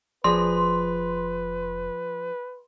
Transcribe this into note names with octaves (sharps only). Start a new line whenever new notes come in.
F1 F3 G#4 B4 D5 C6